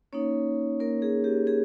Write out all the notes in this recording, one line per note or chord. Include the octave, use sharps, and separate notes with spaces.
A#3 C#4 D#4 C#5
A#3 A#4
G#4
G4
G#4